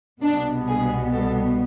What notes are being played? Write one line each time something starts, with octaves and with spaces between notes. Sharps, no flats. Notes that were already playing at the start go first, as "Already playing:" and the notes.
C2 B2 G3 B3 D4
G#4
A4